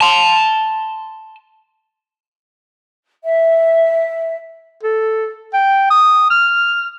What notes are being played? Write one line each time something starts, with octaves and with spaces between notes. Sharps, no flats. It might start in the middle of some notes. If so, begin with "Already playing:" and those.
A5 C6
E5
A4
G5
D#6
F6